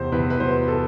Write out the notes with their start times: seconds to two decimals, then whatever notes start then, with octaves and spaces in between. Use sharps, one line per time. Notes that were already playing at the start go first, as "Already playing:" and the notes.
Already playing: E2 C3 C5
0.12 E2 B4
0.30 B4
0.40 F#3 C5
0.68 A4